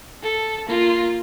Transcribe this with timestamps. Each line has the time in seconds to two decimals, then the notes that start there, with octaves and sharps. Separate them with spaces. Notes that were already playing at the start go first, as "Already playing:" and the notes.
0.23 A4
0.68 A#3 F4